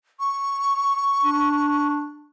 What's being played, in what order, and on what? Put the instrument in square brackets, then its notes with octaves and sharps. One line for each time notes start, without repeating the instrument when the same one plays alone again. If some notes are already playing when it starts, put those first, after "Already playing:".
[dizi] C#6
[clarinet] D4